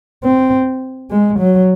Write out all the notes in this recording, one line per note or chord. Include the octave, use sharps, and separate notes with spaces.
C4
G#3
F#3